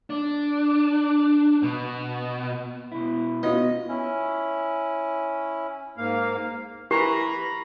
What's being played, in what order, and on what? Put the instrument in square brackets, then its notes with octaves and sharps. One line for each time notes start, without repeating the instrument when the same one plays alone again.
[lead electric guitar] D4
B2
[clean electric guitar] B2 E4
[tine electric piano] B3 F#4 [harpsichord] D#4 [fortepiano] F4 B4
[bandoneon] C#4 E4
[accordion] G#2 A#3 F5
[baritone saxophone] E3 [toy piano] G4 [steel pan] A#4 B4 [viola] A#5 B5